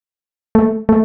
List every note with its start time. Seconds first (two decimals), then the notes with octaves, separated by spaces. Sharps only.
0.55 A3
0.89 A3